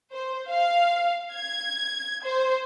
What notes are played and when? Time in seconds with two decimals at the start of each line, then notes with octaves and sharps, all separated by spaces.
0.11 C5
0.49 F5
1.33 G#6
2.24 C5